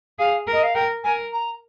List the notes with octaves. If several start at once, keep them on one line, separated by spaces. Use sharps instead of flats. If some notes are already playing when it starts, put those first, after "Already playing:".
G#4 F5
A#4
D#5
F5
A#4 G5
A#4 G#5
A#5